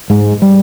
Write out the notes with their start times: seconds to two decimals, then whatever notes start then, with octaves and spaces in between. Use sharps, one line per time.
0.10 G#2 G#3
0.42 G3